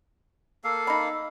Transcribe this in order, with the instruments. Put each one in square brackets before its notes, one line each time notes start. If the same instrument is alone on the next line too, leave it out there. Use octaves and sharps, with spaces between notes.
[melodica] A#3 A4 F5
[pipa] D#4 B5